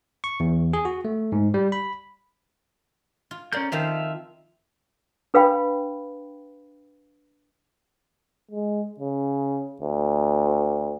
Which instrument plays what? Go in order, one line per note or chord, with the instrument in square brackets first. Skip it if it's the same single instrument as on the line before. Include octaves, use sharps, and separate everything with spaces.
[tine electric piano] C#6
E2
G#4
F#4
A3
G#2
G3
B5
[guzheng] F4
[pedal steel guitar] C#4 D5 G6 [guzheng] A#4 C6
[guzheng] D#3 F3 C4 [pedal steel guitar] F4 E5 F5
[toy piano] D4 B4 F5 G5 B5
[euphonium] G#3
C#3
D2